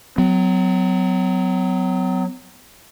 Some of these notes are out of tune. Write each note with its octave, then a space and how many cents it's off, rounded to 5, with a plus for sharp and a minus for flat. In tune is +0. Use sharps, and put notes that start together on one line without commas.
F#3 +0 B3 +45